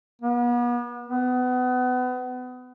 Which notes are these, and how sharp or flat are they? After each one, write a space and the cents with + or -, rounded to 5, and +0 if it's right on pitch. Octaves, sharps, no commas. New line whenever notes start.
B3 -40
B3 +30